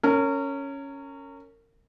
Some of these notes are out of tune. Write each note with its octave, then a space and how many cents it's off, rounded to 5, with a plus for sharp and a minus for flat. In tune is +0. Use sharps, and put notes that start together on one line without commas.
C#4 +0 A#4 -30